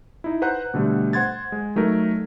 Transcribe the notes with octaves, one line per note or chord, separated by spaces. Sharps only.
D#4 E4
B4 C5 F#5 A#5 F#6 G6
B2 D3 G3 A3
C5 F#5 C6 G#6 A6
G#3
F#3 A3 D#4 A#4